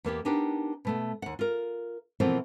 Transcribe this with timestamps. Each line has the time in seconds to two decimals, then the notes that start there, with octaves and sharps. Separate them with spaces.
0.04 E2 A#3 B3 G4
0.25 B3 D4 D#4 G4 A#4 G#5
0.85 B2 A3 B3
1.22 D#2 F#5
1.39 F4 A#4
2.20 B2 E3 F3 A3 A#3 C4